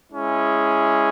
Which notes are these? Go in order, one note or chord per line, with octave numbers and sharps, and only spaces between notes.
G#3 C#4 E4 G#4